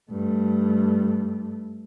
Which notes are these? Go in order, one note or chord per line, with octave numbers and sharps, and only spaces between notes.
G2 A3